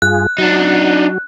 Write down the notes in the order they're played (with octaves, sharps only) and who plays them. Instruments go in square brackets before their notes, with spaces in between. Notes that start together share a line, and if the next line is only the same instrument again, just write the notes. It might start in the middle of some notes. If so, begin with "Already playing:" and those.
[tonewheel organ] G2 F4 G#4 [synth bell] F#6
[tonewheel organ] F#3 F#4 [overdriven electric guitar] D4 D#4